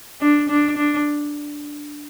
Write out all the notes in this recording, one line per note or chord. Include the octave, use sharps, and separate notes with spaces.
D4
D4
D4